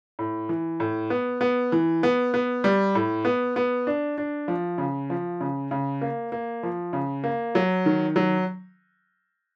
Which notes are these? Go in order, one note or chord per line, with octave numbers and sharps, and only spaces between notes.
A2
E3
A2
B3
B3
E3
B3
B3
G3
A2
B3
B3
D4
D4
F3
C#3
F3
C#3
C#3
A#3
A#3
F3
C#3
A#3
F#3
D#3
F#3